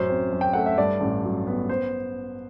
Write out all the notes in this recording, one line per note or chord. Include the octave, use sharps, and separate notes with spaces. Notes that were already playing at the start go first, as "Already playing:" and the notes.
Already playing: A1 F#2 C5
C4
F#2
G5
A3 F#5
E5
G2 D5
A1
F#3
B3
C5